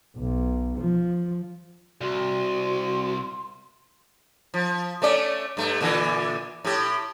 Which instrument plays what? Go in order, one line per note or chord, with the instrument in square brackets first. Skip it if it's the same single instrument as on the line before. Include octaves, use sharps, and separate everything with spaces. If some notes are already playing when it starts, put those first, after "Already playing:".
[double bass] B1
F3
[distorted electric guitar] C2 [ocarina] F#4 [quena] C6
[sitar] F3
A3 C#4 D5
G2 A3
A#2 D3 E3
A2 G4